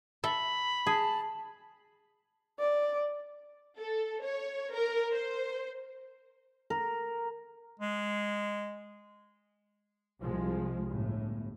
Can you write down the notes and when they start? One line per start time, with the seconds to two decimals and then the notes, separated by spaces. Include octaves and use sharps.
0.24 A4 E5 B5
0.87 G#4 A5
2.59 D5
3.78 A4
4.24 C#5
4.74 A#4
5.13 C5
6.70 A#4
7.80 G#3
10.21 C2 C3 F3 G#3
10.89 G1 A2